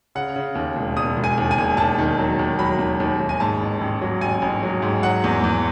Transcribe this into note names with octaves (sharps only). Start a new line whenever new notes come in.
C#3 F#5
C#3
D#2
E1
E1 D#6
E1
G#5
D#2
G#5
E1
D#2 A5
D#3
F#3
D#2
F#3 B5
D#2
D#2
D#2
G#5
G#2 A5
A1
A1
F#3
A1 G#5
A1
F#3
G#2
F#3 F#5
E2
E2